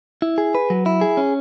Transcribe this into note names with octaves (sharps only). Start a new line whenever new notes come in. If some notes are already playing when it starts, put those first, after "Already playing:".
E4
G#4
B4
F#3
E4
G#4
C#4